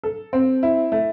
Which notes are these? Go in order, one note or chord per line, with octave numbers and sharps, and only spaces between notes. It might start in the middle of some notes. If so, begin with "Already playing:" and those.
A4
C4
E4
A3